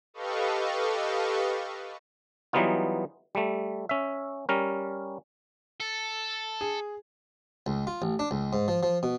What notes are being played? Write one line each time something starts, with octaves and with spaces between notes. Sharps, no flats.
G4 A4 B4 D#5 F5 C#6
E3 F#3 G3 B3 D#4 F4
G3 A3
C#4 E5
G3 C#4 A#4
A4
G#4
C#2
F4
A1
D4
C#2
G#2
F3
F3
B2